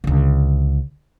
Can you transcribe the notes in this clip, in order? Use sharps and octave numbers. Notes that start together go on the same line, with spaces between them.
C#2 D3